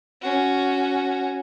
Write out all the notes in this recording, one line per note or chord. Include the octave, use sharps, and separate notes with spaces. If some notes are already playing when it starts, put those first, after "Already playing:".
C#4 F#4